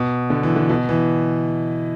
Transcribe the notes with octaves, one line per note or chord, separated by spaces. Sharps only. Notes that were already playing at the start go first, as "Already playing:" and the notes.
Already playing: B2
D3
E3
D3
B2
E3